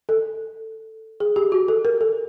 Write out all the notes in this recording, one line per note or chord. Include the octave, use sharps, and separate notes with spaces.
A4
G#4
G4
F#4
A4
A#4
A4